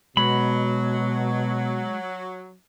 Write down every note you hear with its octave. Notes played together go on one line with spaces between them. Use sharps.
B2 F#3 G#3 B5